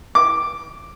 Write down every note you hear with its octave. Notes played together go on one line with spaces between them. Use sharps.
D6